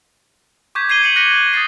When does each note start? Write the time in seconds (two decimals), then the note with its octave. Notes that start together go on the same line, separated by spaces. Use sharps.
0.75 C#6 D6 G6 G#6 B6
0.89 D6 G#6 C7 D#7 G7
1.03 C#7 D#7 F#7
1.16 F#6 A#6 B6 C#7 D#7
1.27 F#7
1.54 D#6 A6 C7